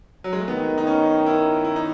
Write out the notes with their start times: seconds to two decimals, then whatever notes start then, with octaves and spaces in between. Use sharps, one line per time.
0.24 F#3
0.33 G#3
0.40 A3
0.48 D#3 B3
0.78 D#4
0.87 C#4
1.26 E4
1.65 E4
1.76 D#4